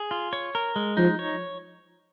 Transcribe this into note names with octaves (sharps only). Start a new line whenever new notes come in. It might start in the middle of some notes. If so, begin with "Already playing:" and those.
Already playing: G#4
F4
C#5
A#4
G#3
F3 D#4
C#5